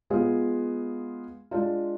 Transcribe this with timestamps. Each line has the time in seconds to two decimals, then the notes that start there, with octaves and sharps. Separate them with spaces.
0.10 G#3 B3 F4 G#4
1.51 G#3 D4 F4